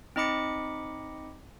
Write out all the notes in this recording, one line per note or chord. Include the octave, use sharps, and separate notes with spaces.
C4 D#4 D#5 B5 D6 C#7